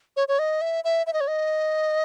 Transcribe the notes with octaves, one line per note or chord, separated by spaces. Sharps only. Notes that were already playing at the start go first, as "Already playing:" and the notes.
C#5
C#5
D#5
E5
E5
E5
D#5
C#5
D#5